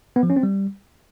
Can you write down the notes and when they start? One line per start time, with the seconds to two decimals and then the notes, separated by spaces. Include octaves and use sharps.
0.16 B3
0.23 F3
0.30 C#4
0.36 C4
0.43 G3